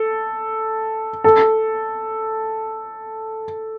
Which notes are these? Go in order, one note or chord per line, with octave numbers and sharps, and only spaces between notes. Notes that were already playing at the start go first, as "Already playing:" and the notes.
Already playing: A4
A4